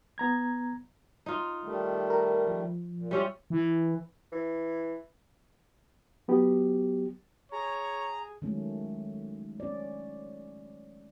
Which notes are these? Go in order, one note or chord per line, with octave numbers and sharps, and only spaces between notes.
B3 A#5 G#6
D#4 F4
D#3 G3 A3
A#4
F3
A#2
G3 C#4 F4 D5 E5
E3
E3
F#3 B3 G4
G#4 C#5 A#5
D#3 F#3 G#3 A3 C#4
C#4 D5